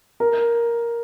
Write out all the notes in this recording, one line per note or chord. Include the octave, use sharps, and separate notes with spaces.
A#4